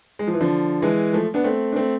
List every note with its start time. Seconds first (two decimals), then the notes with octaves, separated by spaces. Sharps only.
0.19 G#3
0.27 F3
0.34 E3
0.41 D3 F3
0.82 E3 G#3
1.13 F3 A3
1.34 B3 D4
1.44 A3 C4
1.72 D4
1.76 A3 C4